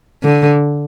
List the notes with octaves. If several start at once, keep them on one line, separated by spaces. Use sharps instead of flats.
D3